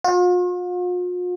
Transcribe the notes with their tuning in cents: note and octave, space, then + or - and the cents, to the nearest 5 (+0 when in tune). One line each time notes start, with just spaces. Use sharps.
F4 +45